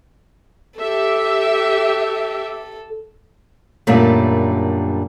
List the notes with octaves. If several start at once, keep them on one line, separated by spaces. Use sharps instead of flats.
G4 A4 E5
F#2 A#2 D3 G3 A3